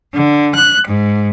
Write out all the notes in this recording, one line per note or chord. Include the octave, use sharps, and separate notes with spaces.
D3
F#6
G#2